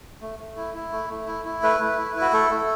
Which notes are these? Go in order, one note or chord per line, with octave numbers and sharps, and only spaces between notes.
A3
A3
E4
E4
A3
A3
E4
E4
A3 B4
A3
E4
E4
F#4
A3 A4
A3